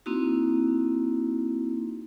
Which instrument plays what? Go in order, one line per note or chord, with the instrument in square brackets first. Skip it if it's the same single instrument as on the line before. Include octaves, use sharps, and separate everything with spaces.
[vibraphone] A#3 C4 D#4 E4 F#4